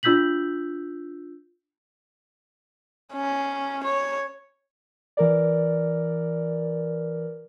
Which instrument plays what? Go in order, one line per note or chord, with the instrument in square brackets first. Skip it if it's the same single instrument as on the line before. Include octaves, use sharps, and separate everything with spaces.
[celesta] D4 F4 E6 G6 B6 F#7
[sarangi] C#4
C#5
[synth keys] E3 A#4 D5